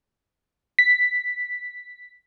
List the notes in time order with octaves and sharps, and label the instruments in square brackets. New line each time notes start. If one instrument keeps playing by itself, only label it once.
[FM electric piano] B6